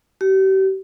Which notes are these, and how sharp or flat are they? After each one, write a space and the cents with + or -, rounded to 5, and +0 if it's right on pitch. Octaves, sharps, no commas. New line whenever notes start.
G4 -40